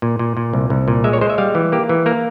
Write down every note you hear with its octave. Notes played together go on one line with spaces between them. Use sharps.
A#2
A#2
A#2
C2
C2
A#2
G#3 E5
C#5
G#3 C5
E5
G3 F5
E3
A#3 G4
E3
A#3 A#4